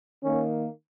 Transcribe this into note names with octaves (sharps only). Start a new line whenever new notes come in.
D#3 A#3 C#4